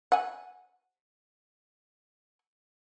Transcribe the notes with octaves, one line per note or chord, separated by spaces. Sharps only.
F#5 G#5